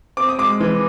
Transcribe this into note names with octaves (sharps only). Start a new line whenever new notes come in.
C4 D6
D#6
G#3 D6
E3